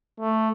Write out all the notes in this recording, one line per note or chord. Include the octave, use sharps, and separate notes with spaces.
A3